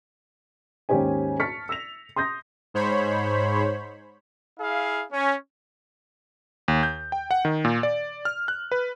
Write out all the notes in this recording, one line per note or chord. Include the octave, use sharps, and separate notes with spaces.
D#2 G#2 C#4 G4 C5 G#5
A5 C#6 F6 A6 B6 C#7
E6 A#6 F7
C6 D#6 G6 A#6
G#2 C5 C#5 B5
E4 G#4 F5
C#4
D#2
G6
G5
F#5
D#3
A#2
D5
F6
F#6
B4